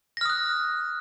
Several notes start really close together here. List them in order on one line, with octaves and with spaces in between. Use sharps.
A#6 F6 D#6 F#6